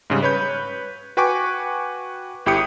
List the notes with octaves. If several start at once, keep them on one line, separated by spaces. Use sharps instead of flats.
G#2 C#3 G3
B4 C#5 B5 G6
F#4 B4 G5 G#5 C#6 D6
G1 E4 G4 G5 D#6 C#7